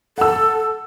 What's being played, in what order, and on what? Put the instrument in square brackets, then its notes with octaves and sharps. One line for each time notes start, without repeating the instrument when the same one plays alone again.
[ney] A4 [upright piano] F#5 E6